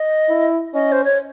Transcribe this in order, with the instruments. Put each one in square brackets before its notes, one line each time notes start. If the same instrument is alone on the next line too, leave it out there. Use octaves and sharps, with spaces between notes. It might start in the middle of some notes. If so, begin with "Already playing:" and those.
Already playing: [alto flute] D#5
[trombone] E4
[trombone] C#4 [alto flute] D#5
[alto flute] C5
C#5